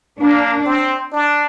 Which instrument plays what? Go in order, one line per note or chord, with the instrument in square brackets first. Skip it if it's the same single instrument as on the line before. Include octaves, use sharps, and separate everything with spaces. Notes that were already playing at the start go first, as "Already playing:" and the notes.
[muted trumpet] A#3 [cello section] D4
[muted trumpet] C4
D4